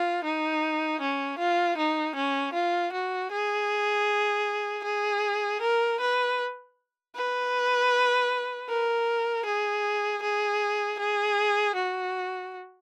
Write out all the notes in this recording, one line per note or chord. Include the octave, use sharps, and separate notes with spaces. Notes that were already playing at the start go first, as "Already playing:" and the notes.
Already playing: F4
D#4
C#4
F4
D#4
C#4
F4
F#4
G#4
G#4
A#4
B4
B4
A#4
G#4
G#4
G#4
F#4